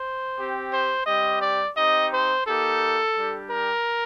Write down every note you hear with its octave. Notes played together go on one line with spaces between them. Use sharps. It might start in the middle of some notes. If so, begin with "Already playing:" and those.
Already playing: C5
C4 G4
C5
G3 C4 G4 D#5
D5
C4 D#4 G4 D#5
C5
A#3 D#4 G4 A4
G3 D4 G4
A#4